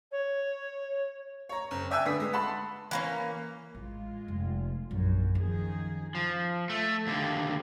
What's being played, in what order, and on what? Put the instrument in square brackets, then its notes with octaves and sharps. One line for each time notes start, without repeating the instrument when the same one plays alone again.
[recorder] C#5
[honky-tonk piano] C#5 A#5
F#1
D5 E5 G5 G#5 E6 F#6
D3 B4 D#6 B6
G#3
F#5 A5 B5 C6
[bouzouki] E3 A#3 C#4
[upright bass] A1 [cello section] G#3 F4
[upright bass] F1
[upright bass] A#1 [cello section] F#2
[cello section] D#3 F3 G#4 [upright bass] C#4
[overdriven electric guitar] F3
A3
D#2 D3